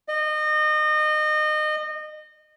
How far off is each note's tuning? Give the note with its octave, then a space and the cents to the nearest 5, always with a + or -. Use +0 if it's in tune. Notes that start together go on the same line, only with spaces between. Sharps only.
D#5 -30